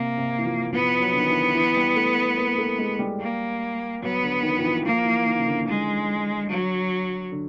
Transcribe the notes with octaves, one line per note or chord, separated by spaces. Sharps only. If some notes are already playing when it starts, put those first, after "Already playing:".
Already playing: C3 A#3
C3
E3
F3
F3 B3
F#3
D3
D#3
E3
E3
G3
A3
A#3
A3
G#3
G3
A#3
F#3 B3
D3
D#3
F3
E3
F3 A#3
E3
D#3
C#3
D3
G#3
F#3
D3